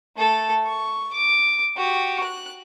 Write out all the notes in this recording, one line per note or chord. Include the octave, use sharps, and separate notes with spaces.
A3 A4
C#6
D6
F#4 G4
F#6